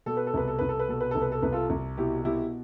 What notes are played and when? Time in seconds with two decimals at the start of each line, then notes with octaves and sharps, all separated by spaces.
0.06 B2 A4
0.17 B4
0.27 A4
0.34 C2 B4
0.47 A4
0.59 C2 B4
0.69 A4
0.79 B4
0.88 B2 A4
1.00 B4
1.11 C2 A4
1.22 B4
1.32 A4
1.43 C2 B4
1.52 F4 A4
1.70 C2
1.97 B2 E4 G4
2.25 B2 E4 G4